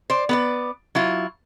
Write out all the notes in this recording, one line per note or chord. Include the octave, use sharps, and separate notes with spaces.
C5 D5
B3 B4 D5
F#3 E4 F4